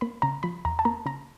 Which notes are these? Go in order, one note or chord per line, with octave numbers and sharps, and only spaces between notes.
A#3 B5
C#3 A#5
F3 B5
E2 A#5
A5
A#3 A#5
C#3 A#5